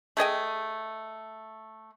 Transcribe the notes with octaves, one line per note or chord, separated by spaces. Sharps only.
A3 G#4 D#5 G5